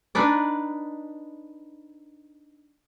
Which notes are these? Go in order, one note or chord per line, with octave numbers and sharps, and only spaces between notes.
D4 D#4 B4 D5